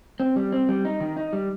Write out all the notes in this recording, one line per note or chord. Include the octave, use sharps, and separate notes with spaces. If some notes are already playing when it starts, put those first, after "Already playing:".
C4
G3
C4
G3
D#4
D#3
D#4
G3